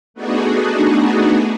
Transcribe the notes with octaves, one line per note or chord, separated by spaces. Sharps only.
A3 B3 D4 D#4 F#4 G#4